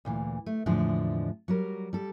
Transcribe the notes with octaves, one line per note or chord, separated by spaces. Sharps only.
D2 A#2 E3
A3
E2 A2 D3 F3 G#3 D4
F#3 G3 A#4
G3 A4